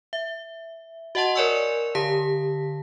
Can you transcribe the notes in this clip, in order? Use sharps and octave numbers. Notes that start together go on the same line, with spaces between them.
E5
F#4 D#5 F#5 A5 C6
A#4 C#5 D5 G#5 C#6 E6
D3 G4 A5 B6